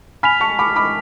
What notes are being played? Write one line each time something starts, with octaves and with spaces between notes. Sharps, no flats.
G#5 B5 F6 B6 F7
A5 C#6
B5 D6
B5 D6